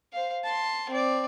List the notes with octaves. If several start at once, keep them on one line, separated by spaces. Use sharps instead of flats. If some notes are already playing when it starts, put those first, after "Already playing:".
C5 F5
A5 C6
C4 D5